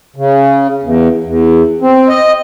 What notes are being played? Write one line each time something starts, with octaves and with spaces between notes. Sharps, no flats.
C#3
E2
E2
C4
D#5